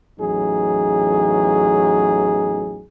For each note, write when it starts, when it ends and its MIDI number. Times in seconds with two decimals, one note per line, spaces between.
0.19 2.84 33
0.19 2.84 40
0.19 2.84 54
0.19 2.84 63
0.19 2.84 68